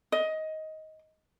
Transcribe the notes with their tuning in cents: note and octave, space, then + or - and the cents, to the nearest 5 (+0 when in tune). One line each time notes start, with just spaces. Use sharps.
D#5 +15